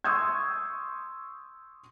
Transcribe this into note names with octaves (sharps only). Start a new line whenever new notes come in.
C6 C#6 D#6 E6 G6 G#6